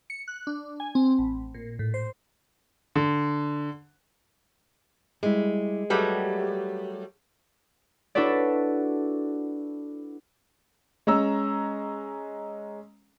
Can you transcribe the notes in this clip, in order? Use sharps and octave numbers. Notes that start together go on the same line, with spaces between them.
C#7
F#6
D4
G#5
C4
A1
A#2
A2
C5
D3
G3 G#3 E4
F#3 G3 A3 G4 G#4 B4
D4 E4 F#4 A4 B4 D5
G#3 C#4 A#5 E6